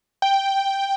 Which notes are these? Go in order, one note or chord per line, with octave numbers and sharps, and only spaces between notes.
G5